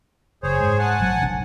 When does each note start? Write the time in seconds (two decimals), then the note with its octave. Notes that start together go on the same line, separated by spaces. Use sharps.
0.43 F#1 G#4 C5 C#5
0.60 G#2
0.79 F#5 G#5 A5
1.00 A1 F#3
1.20 F1 B1 D4